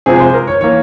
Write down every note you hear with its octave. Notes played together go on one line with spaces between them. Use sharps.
C3 F3 G#3 G#4
C5
A#4
C#5
E3 A#3 C#5